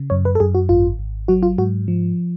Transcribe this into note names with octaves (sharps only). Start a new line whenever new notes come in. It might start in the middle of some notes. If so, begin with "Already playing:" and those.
Already playing: C#3
F#2 C#5
B4
A4
F#2 G#4
F#4
G#1 F4
G#1
F#3 F#4
F4
G#2 F#4
F3